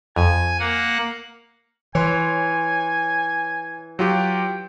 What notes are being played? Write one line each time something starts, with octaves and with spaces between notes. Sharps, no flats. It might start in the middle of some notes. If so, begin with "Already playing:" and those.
F2 G#5
A#3 F#5
E3 C#5 G#5 C6
F#3 F4 G4 G5